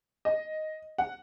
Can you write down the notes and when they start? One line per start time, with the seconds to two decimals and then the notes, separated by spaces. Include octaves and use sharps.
0.25 D#5
0.98 F#5